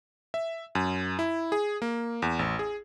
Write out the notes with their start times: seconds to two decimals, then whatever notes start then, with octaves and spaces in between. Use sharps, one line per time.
0.34 E5
0.75 F#2
1.19 E4
1.52 G#4
1.82 A#3
2.22 E2
2.39 A1
2.59 G#4